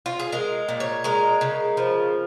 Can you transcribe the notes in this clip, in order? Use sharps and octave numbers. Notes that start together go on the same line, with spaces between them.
F4
G#4
G#3 A#4
A#2
C#5
G#3 A#4
C#3
F3